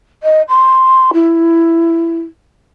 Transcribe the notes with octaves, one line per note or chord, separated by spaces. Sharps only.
D#5
C6
E4